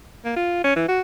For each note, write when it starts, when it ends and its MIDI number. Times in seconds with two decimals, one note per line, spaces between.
0.25 0.34 58
0.37 0.64 65
0.64 0.76 61
0.76 0.85 52
0.89 1.01 66